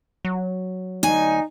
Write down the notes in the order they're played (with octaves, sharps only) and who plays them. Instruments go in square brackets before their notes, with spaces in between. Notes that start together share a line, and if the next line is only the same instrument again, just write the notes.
[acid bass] F#3
[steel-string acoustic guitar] D2 G#5 [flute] D#4